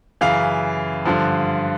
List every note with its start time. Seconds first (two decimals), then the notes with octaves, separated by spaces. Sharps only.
0.21 F#2 C#3 E3 F5
1.05 G2 D3 F3